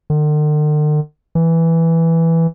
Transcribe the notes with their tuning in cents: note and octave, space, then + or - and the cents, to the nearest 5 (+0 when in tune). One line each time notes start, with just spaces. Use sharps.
D3 +45
E3 +0